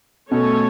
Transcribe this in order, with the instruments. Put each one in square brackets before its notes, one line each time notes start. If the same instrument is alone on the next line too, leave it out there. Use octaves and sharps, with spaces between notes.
[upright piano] B2 [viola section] A3 C#4 A4 C#5